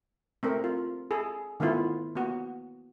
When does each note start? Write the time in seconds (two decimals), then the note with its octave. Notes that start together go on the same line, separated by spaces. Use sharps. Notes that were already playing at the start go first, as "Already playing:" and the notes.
0.43 A3 C4 A#4
0.64 F4
1.11 G#4 A4
1.60 D#3 A3 B3 E4 F4
2.15 A#3 B3 F#4